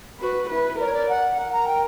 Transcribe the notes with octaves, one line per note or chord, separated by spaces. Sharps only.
F#4 B4
E4 B4
A#4 D5
C#5
D5
F#5
A#4 F#5
A#5
G5